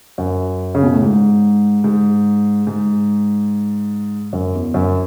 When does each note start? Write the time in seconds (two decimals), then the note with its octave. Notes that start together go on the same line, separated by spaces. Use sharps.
0.18 F#2
0.75 C#3
0.83 B2
0.92 A2
1.01 G#2
1.84 G#2
2.67 G#2
4.33 F#2
4.54 E2
4.74 F#2